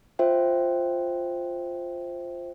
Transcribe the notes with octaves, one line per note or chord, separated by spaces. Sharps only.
F4 C5 E5 G5